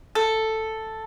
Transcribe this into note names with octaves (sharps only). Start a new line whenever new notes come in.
A4